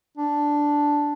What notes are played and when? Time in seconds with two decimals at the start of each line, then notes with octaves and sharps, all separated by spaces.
0.17 D4